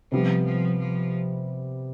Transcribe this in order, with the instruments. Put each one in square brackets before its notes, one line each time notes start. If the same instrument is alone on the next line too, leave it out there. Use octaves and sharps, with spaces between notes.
[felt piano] C3 G3 B3 [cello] F3
[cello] F3
F3